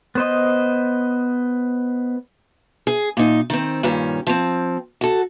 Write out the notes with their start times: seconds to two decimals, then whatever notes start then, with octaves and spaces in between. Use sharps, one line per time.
0.15 B3 C5 D#5
2.87 G#4
3.17 A#2 D#4
3.50 D#3 C4
3.83 G2 A#2 D#3 C#4
4.27 F3 C4
5.01 F#4 A4